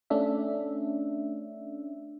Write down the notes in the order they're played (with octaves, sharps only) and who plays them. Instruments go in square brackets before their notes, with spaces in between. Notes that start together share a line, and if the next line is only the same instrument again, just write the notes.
[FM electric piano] A3 C#4 D4 E5